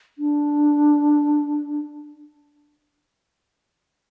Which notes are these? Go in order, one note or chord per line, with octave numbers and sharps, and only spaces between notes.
D4